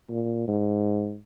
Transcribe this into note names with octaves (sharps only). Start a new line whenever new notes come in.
A#2
G#2